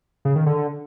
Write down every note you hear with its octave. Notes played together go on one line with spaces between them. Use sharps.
C#3
D#3
D3